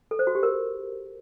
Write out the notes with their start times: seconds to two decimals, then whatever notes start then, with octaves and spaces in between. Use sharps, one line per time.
0.11 A4
0.19 C5
0.27 F#4
0.35 G4
0.43 A#4